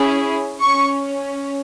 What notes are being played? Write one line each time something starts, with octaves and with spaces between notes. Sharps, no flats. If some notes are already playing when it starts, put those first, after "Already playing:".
Already playing: C#4 E4 G#4
C#4 C#6